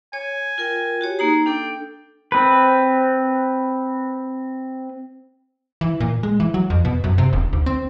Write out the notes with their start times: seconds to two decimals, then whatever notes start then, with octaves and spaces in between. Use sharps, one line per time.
0.13 C#5 G#5
0.58 F4 A#4 G5
1.01 F#4 G4 C#5
1.19 A#3 D#4 G#4 A#5
1.46 D4 A4 G5
2.32 C4 B4
5.81 E3
6.00 A#2
6.23 G#3
6.40 E3
6.54 F#3
6.70 F2
6.85 B2
7.04 F#2
7.18 C3
7.33 E1
7.53 D2
7.66 C4